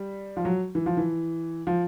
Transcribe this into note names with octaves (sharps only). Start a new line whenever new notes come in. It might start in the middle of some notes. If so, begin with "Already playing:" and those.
Already playing: G3
F3
F#3
E3
F3
E3
F3